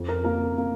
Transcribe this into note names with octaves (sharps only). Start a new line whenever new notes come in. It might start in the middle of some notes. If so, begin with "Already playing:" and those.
Already playing: F2
A#4
A#3 A#4
A#3